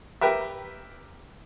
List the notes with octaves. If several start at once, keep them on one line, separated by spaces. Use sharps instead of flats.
G4 A#4 B4 E5